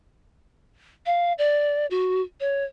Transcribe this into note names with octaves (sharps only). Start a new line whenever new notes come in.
F5
D5
F#4
C#5